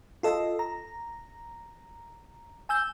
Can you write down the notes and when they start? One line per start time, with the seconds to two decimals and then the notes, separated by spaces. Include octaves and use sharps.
0.23 F4 A4 D#5
0.59 A#5
2.69 G#5 E6 G6